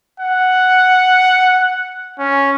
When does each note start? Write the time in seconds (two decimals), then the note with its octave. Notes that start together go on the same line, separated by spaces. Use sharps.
0.20 F#5
2.19 C#4